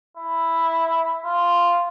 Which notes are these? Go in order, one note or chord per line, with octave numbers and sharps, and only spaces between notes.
E4
F4